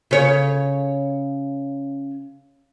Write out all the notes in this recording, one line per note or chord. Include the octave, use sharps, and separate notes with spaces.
C#3 C#5